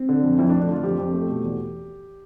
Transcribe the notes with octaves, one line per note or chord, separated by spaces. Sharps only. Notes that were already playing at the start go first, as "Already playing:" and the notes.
Already playing: C4
D3
F2
F2 E4
D4
A3
D4
D3 F4
F2 G4
F2
A3
B2
E2